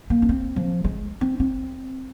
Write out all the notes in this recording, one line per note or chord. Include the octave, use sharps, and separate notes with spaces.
A#3
C#4
C4
F3
G#3
C4
C4